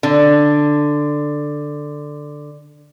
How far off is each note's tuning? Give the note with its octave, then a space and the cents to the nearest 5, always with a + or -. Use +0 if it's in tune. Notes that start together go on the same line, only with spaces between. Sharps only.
D3 +5